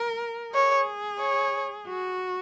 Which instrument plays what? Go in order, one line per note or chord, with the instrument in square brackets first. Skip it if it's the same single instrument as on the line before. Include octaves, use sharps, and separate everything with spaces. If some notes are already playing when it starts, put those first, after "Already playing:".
Already playing: [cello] A#4
[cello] G#4 [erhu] C#5
[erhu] C#5
[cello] F#4